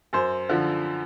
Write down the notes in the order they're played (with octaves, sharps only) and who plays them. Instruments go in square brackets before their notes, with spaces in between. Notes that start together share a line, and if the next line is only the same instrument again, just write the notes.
[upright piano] F#2 C5
D3 F3